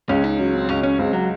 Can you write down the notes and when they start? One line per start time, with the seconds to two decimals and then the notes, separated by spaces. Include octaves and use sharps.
0.09 C#2 C#4
0.24 D#4
0.39 F#3 C#4
0.54 C4
0.69 C#2 C#4
0.83 C#4
0.98 C#2 C4
1.13 F#3